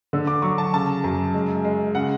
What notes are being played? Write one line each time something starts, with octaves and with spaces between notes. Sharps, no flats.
D3
D6
F#3 C#6
A5
C#3 A5
F#2
G#3
G#3
C#3 F#5